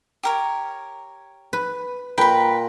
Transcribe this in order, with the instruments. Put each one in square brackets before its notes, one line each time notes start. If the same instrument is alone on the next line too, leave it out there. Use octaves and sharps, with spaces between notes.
[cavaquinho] G4 A#4 C#5
[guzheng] B4
[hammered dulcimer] A#2 A#5 [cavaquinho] B4 B5 [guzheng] G5